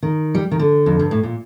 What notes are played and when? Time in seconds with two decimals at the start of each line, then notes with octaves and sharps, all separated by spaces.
0.03 D#3
0.35 G3
0.51 D#3
0.59 D3
0.86 F2
0.99 G2
1.11 A2
1.23 A#2